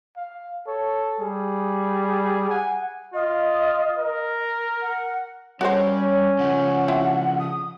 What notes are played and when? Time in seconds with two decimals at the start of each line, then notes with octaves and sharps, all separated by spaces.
0.17 F5
0.67 A4 C#5
1.20 G3 G#4
2.50 F#5 G#5
3.14 F4 D#5
3.99 A#4
4.82 F#5
5.61 G3 C#4 F#4 A#4 C5 C#5
6.39 C#3 F3 F#5
6.88 C4 E4 F4
7.39 D#6